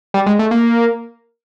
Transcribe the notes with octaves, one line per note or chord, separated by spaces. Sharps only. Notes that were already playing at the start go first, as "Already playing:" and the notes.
G3
G#3
A3
A#3